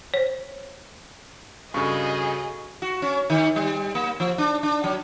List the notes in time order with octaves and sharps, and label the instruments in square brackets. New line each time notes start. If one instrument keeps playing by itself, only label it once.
[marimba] C5 C#5
[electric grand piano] G2 C#3 [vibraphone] F#4 A4 C#5 [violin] G#4 D#5 [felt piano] C#6
[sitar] F#4
C#4
D#3
G3
A#3
F3
D4
D4
F#3